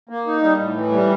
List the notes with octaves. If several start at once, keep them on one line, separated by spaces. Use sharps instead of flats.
A#3
D#4
G3
A2
E3
G3